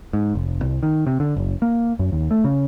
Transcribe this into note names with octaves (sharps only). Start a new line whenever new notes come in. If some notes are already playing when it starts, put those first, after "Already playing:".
G#2
F1
C2
D#3
C3
D3
F#1
A#3
F#2
D#2
A3
C#3